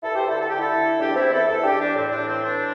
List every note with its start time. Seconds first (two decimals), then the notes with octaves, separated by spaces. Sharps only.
0.03 G2 E4 A4
0.16 G4 C5
0.28 D3 E4 A4
0.40 A4
0.49 D3 G4
0.59 E4 A4
0.76 D3
1.00 E2 D4 G4
1.15 C4 E4
1.24 E2
1.32 E4 A4
1.48 E2 E4 A4
1.64 D4 G4
1.72 E2
1.80 D4
1.95 A2 C4
2.12 D4
2.20 E3
2.28 C4
2.43 E3 D4